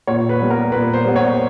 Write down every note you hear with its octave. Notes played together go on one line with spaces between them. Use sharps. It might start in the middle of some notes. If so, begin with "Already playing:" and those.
A#2 C#5
B4
G3 B3
A#4
A#2 B4
C5
G3 B3
C#5